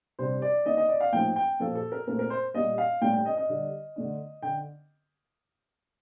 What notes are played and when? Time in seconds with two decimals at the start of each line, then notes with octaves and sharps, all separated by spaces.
0.19 C3 G3 D4 C5
0.42 D5
0.65 D#3 A#3 D4 D#5
0.77 D#5
0.89 D5
1.00 F5
1.13 A2 F3 A#3 D#4 G5
1.36 G5
1.60 A#2 F3 A#3 A4
1.75 A4
1.92 A#4
2.07 A#2 A3 C4 A#4
2.19 A#4
2.30 C5
2.54 A#2 G3 A#3 D#5
2.78 F5
3.01 A2 G3 A#3 D4 G5
3.14 G5
3.26 D#5
3.37 D#5
3.49 D3 G3 D4
3.96 D3 A3 D4
4.42 D3 G5